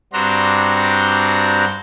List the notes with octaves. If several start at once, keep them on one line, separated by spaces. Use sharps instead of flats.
G2 C4 D4 F#4 C5 A#5